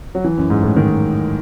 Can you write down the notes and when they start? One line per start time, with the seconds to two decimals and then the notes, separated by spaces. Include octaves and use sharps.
0.15 F#3
0.24 E3
0.38 F#2
0.50 G#2
0.63 A2
0.76 D#3